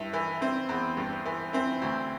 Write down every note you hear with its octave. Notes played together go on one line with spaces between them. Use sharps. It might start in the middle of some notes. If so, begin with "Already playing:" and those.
Already playing: G2 E4
E3
E3 C4
E2
G2
E3
E3 C4
D2